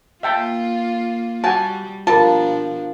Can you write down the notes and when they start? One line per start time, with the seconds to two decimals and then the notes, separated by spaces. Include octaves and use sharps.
0.23 A#3 F4 E5 G5 A5
1.44 G3 F#4 G#5 A5
2.07 B2 F3 G3 D4 F4 A#4 A5